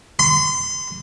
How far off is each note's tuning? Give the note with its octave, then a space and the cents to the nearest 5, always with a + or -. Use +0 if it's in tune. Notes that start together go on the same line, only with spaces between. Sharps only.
C6 -35